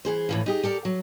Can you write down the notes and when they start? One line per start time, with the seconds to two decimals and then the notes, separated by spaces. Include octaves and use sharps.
0.05 E3 G#4 C5
0.29 A2 E3 F3
0.46 D#4 G4 G#4
0.63 G4 A4 A#4 D5
0.85 F#3